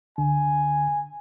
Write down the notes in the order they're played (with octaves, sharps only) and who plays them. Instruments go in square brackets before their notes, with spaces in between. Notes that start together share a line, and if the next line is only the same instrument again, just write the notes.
[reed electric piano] C#2 D3 [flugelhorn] G#5